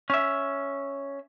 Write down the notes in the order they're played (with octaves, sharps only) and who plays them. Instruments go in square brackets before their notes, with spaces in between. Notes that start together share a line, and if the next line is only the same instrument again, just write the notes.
[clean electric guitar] C#4 E5